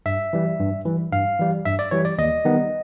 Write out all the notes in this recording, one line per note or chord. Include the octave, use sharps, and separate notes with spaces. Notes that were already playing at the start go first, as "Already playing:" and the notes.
G2 E5
E3 G3
G2
E3 G3
G2 F5
E3 G3
G2 E5
D5
E3 G3 C#5
D5
D#2 D#5
D#3 G3 B3